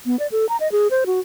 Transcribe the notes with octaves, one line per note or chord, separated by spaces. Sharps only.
B3
D5
A4
A#5
D#5
G#4
C5
F#4